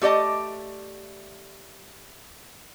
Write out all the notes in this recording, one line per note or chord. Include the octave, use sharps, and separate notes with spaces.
A3 G4 D5 D#5 A5